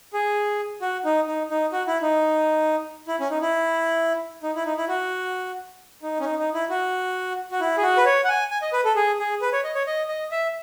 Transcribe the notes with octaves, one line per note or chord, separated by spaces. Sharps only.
G#4
F#4
D#4
D#4
D#4
F#4
E4
D#4
E4
C#4
D#4
E4
D#4
E4
D#4
E4
F#4
D#4
C#4
D#4
D#4
E4
F#4
F#4
E4
G#4
F#4
B4
C#5
F#5
G#5
G#5
D#5
B4
A4
G#4
G#4
B4
C#5
D#5
C#5
D#5
D#5
E5